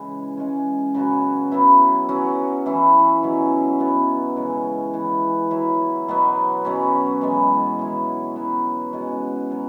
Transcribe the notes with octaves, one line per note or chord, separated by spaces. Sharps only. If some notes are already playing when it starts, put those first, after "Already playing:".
Already playing: C#3 E3 G#3
C#3 G#3 C#4
C#3 F#3 B3 F#4
F#3 B3 E4
F#3 C#4 F#4
E3 C#4 E4
B2 F#3 C#4
F#3 B3 E4
C#3 E3 G#3 C#4
E3 B3 E4
F#3 E4
B2 F#3 B3
B2 F#3 C#4
E3 G#3 B3
F#3 E4
F#3 B3 E4
B2 G#3 C#4 F#4
B2 F#3